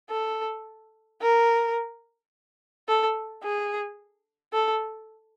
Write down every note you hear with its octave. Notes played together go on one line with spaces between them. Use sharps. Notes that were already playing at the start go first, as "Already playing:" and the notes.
A4
A#4
A4
G#4
A4